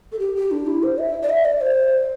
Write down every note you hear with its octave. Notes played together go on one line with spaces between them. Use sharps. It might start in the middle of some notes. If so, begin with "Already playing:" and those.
A4
G4
G4
D4
E4
C5
E5
D5
E5
D5
C5